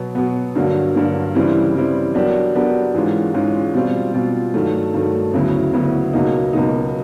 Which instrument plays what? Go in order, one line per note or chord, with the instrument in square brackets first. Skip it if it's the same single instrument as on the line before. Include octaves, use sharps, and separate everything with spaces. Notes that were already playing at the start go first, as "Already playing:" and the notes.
Already playing: [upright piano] B2 F#3 B3
B2 F#3 B3
G2 D3 F#3 A#3
G2 D3 F#3 A#3
C#3 E3 G3 C4 E4
C#3 E3 G3 C4 E4
F#3 B3 D4 G4 A#4
F#3 B3 D4 G4 A#4
G#2 E3 G#3 C#4 F4
G#2 E3 G#3 C#4 F4
B2 G3 C4 F4
B2 G3 C4 F4
G2 D#3 F#3 A3
G2 D#3 F#3 A3
D2 C#3 F#3 B3 E4
D2 C#3 F#3 B3 E4
C#2 B2 F#3 A#3 D#4
C#2 B2 F#3 A#3 D#4